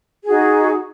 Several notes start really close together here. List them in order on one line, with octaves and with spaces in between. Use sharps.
G#4 F#4 D#4